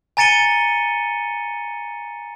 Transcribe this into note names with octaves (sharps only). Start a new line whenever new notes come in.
G#5 A#5 A6 C#7 D#7 G7